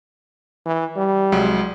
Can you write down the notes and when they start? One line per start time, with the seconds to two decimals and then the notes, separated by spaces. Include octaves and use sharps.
0.66 E3
0.97 G3
1.32 C2 F#3 G#3